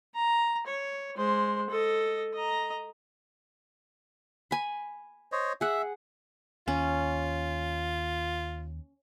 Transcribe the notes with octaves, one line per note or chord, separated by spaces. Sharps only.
A#5
C#5
G#3 C5
A4 D#5
D#5 A#5
G#5 B5
C5 C#5 D#5
G#4 E5 F#5
D#2 C#4 F4